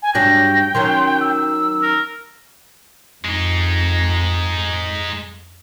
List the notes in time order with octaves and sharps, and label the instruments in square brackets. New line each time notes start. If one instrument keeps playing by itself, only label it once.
[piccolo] G#5
[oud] G2 F#3 D4 [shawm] G5 [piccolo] A#6
[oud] D#3 F#3 C#4 [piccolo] C6
[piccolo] E6
[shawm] A#4
[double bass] F2 [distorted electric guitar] G#3 D#4